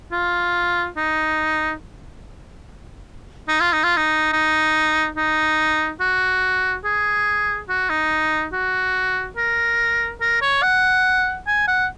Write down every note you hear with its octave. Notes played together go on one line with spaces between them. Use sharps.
F4
D#4
D#4
F4
D#4
F4
D#4
D#4
D#4
F#4
G#4
F#4
D#4
F#4
A#4
A#4
C#5
F#5
G#5
F#5